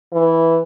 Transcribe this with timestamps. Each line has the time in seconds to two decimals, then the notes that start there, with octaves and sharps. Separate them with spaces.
0.13 E3